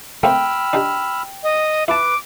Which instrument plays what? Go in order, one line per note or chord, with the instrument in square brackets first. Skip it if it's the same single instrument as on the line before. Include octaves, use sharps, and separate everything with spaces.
[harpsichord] A3 A#3 C4 [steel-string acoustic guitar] G5 [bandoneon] B5 E6 F6
[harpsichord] D4 D#4 G4
[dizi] D#5
[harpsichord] E4 A5 [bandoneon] B4 [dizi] D6